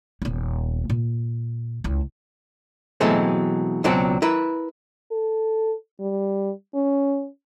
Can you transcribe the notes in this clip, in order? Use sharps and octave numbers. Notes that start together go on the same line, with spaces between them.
D#1 B3
A#2
C#2 E4
B2 E3 F#3 G#3 A3 C4
C#2 B2 F#3 C4 F#4 D5
E4 A#4 B4
A4
G3
C#4